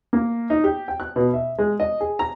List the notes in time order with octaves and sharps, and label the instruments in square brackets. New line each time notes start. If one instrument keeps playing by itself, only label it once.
[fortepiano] A#3
D#4
G4
G5
F#6
B2
E5
G#3
D#5
G#4
A#5